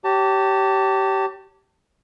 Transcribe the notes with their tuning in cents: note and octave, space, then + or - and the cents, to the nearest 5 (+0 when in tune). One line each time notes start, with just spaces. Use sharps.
G4 -20 C#5 +0 A5 +25